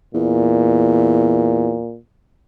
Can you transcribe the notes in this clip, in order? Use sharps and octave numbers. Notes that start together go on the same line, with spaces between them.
E2 A#2